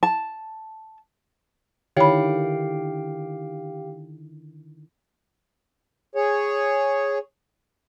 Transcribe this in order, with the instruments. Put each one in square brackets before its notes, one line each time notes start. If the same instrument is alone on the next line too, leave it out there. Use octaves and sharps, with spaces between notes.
[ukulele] A5
[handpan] D3 D#3 E4 [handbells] G4 F5 G5 [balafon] C#5 B5
[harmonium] G#4 C#5